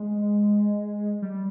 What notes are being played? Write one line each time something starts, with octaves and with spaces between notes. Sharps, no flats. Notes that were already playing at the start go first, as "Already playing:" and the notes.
Already playing: G#3
G3